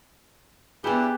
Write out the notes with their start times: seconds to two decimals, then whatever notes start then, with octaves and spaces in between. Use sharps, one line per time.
0.84 B3 D4 E4 G4 G#4 B4 C5